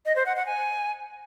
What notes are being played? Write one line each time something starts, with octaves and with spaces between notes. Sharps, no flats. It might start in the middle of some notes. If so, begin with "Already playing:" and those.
D#5
C5
F#5
F#5
G#5